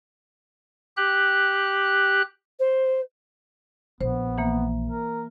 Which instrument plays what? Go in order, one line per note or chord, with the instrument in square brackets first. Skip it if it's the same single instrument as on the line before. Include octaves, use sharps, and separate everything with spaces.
[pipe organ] G4 F#6
[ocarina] C5
[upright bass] A#1 [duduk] B3 [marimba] C5
[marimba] E3 A#3
[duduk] A#4